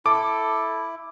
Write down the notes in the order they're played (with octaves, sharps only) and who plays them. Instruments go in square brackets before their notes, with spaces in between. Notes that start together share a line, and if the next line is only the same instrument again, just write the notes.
[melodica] E4 [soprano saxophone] A4 [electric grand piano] D6